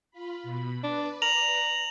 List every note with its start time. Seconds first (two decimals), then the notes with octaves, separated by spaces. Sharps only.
0.11 F4 B5
0.43 B2 B5
0.84 D4 B4 D5
1.22 A#5 F7 F#7